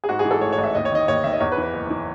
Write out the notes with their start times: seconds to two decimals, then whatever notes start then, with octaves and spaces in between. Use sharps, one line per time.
0.04 G#4
0.09 G#2 F#4
0.19 G#4
0.25 E3
0.31 A4
0.41 A1 C#5
0.52 C#5
0.58 A1
0.64 E5
0.75 D#2 D#5
0.85 C#5
0.92 D#3 D#5
1.08 D#2 C#5
1.24 D#3 E5
1.32 D#5
1.40 E2 C#5
1.52 B4
1.57 E3
1.63 B4
1.73 F#1
1.90 E3